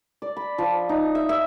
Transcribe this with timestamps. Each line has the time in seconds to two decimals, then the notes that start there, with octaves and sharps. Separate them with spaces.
0.22 D5
0.37 B5
0.58 F3
0.89 D#4
1.15 E5
1.29 E5